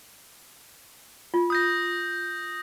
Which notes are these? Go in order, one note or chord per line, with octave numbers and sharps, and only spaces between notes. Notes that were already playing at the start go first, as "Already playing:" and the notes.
F4
D#6 G6 A#6